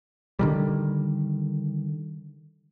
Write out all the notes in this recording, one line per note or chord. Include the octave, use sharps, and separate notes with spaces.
D3 D#3 G3